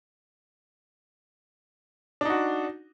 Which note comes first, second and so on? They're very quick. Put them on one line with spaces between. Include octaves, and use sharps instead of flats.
D4 D#4 F#4